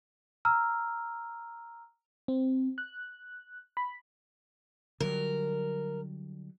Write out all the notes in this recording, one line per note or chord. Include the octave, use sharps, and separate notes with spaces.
A#5 E6 F6
C4
F#6
B5
D3 F#3 G3 A#4